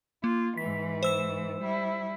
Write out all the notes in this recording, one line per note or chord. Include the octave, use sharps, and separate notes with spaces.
A#3 F4
G#2 E3 B6
C5 E6 E7
G3 E4